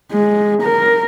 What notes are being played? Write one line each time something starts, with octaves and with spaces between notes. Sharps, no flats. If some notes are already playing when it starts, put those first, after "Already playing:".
G#3
A#4